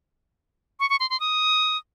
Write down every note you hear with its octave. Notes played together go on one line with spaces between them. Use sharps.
C#6
C#6
C6
C6
D#6